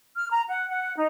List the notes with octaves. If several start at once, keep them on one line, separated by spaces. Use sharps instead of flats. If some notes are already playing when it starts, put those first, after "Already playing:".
F6
A#5
F#5
F#5
D#4